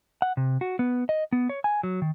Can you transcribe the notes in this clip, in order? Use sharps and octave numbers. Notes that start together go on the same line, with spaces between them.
F#5
C3
F#4
B3
D#5
B3
C#5
G#5
F#3
D#3